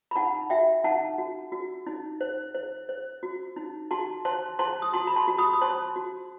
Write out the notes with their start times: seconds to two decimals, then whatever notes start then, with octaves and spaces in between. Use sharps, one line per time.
0.11 B5
0.16 D#4 F#5 A5
0.50 F#4 E5 G5
0.84 D#4 F#5 A5
1.18 F#4
1.52 F#4
1.87 D#4
2.21 C5
2.55 C5
2.89 C5
3.23 F#4
3.56 D#4
3.91 F#4 A5 C6
4.25 C5 A5 C6
4.59 C5 A5 C6
4.82 D#6
4.93 F#4 A5 C6
5.07 B5
5.16 A5 C6
5.28 F#4
5.38 B5 D#6
5.53 D#6
5.61 C5 A5 C6
5.96 F#4